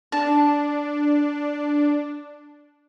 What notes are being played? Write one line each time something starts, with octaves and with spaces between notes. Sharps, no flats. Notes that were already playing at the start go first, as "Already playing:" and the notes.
D4 A5